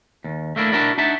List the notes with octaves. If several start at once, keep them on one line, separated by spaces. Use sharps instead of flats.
D#2
A3 A#3 D4 E4
D4 E4 F#4 A#4 D5
D4 D#4 F#4 E5 A5